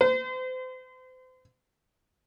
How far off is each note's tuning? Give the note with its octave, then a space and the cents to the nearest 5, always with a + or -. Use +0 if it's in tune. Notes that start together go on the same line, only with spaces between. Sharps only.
C5 -35